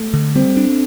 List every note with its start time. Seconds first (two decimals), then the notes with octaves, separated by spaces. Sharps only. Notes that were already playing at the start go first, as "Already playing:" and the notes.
Already playing: A3
0.14 D3
0.35 G3 C4
0.57 D4